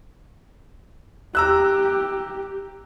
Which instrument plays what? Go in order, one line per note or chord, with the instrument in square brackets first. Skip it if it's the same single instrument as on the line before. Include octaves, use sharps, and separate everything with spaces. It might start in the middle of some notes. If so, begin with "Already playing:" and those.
[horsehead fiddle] G4 [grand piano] A#5 E6 F#6